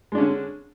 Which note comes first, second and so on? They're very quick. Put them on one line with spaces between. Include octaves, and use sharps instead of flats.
G#3 D4 C#4 D3